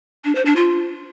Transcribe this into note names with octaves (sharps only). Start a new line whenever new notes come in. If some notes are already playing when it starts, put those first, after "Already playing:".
D4
C5
D4
F4